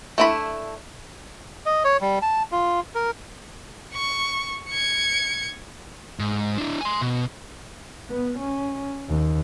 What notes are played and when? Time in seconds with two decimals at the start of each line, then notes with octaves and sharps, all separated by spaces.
0.18 A3 D4 E4 D5 B5
1.66 D#5
1.84 C#5
2.01 G3
2.22 A5
2.52 F4
2.95 A#4
3.93 C#6
4.69 G#6 C#7
6.19 G#2
6.58 D4 E4
6.81 G#5 C6
7.01 B2
8.09 B3
8.39 C#4
9.09 D#2